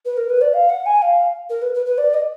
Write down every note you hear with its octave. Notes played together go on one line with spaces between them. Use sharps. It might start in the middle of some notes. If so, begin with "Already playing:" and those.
B4
A#4
B4
D5
F5
F#5
G#5
F5
A#4
B4
B4
B4
D5
D#5